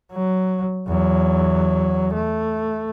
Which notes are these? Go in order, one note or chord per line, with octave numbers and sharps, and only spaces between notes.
F#3
E2 F#3
A3